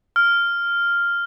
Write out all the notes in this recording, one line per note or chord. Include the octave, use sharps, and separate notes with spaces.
F6